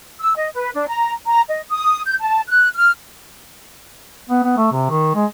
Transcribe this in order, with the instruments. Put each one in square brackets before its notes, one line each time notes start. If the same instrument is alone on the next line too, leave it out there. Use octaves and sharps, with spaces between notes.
[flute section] E6
D#5
B4
D4
A#5
A#5
D#5
D#6
G6
A5
F#6
F6
[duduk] B3
B3
A3
C3
D#3
G#3